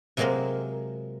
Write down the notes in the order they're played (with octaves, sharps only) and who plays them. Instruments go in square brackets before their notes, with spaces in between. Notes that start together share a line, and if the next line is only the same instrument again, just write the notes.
[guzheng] C3 F#3 G#3 A#3 C4 A#4